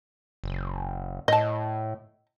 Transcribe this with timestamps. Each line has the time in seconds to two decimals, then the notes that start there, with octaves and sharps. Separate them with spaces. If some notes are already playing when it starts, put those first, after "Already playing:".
0.44 F#1
1.28 A2 D#5 A5